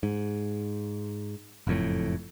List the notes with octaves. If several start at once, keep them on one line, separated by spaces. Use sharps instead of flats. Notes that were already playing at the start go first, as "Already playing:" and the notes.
G#2
F#1 F2 A2